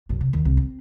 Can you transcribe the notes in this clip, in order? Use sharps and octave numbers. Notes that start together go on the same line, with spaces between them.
B1 F#2
C3
D#2 D#3
C2
C4